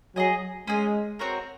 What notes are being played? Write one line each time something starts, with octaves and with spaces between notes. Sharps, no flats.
F#3 G#4 D#5 G#5
G#3 C#4 G#4 D#5 G#5
C4 F#4 A#4 C#5